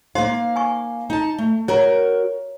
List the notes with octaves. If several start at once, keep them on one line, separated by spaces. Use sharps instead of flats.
A#3 D#4 C5 F5 C6
G#5 C#6
D#4 A5
A3
F#4 A#4 C#5 A#5